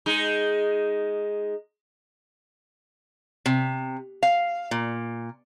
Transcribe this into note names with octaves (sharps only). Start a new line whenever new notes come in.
G#3 D#4
C3
F5
A#2